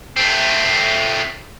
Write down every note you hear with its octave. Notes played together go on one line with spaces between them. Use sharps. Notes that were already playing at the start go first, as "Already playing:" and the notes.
A3 C4